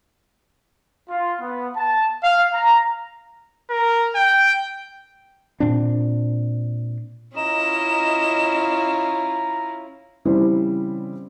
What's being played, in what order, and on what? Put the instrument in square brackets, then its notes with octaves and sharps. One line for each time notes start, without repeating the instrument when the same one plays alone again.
[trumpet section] F4
B3
A5
F5
A#5
[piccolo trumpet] A#4
G5
[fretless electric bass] A#2 C4 D4
[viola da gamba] C#4 E4 F4 [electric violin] D#5 [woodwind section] A#5 [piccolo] E7
[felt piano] C#3 E3 G3 C4 E4 C5